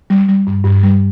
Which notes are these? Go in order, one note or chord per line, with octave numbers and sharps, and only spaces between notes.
G3
G3
G2
G2
G3